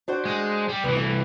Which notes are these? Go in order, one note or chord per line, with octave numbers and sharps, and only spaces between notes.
D4 F#4 C5
G#3
G3
C2 E3 B3
A3